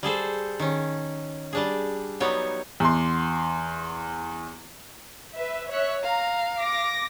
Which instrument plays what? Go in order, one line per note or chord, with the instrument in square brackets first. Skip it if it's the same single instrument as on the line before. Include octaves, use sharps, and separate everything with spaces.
[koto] G3 G#4 A4 C5
D#3 C#4
G3 D4 G#4
F#3 G3 B3 D#4 C#5
[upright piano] E2 C6
[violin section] B4 E5
C#5 E5 F#6
[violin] F5 [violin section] A#5
[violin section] D6 A#6